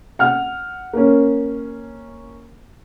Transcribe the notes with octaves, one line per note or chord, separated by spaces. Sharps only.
F#5 F6
A#3 C#4